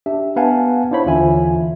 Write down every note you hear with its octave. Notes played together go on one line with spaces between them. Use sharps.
D4 G4 E5
B3 B4 F5 F#5 G#5 A5
D4 E4 C5 C#5 B5
D#2 D3 E3 F4 E5 G#5